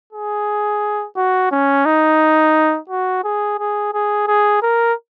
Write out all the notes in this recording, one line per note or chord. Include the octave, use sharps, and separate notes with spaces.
G#4
F#4
C#4
D#4
F#4
G#4
G#4
G#4
G#4
A#4